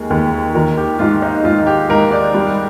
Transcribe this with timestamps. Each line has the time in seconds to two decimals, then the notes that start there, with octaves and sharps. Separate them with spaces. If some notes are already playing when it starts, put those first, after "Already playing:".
Already playing: D#2 G#3 G#4 A#4
0.10 D#2
0.55 D#3 A#4
0.77 G4
0.99 G#2 F4
1.22 D#4
1.44 G#2 F4
1.67 G4
1.89 G#2 A#4
2.11 D5
2.34 G3